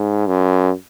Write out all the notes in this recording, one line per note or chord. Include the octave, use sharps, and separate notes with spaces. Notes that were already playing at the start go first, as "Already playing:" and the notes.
Already playing: G#2
F#2